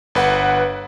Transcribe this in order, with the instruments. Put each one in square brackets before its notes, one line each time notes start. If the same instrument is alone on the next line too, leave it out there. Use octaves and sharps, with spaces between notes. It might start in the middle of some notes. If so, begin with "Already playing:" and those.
[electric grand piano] G1 B4 F#5